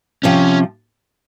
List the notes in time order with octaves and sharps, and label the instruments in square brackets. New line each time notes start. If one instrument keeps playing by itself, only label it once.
[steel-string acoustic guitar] C3 F3 [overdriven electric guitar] C#4